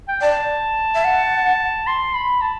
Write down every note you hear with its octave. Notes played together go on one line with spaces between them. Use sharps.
G5
D5 A5
E5
F#5
C6
B5
A5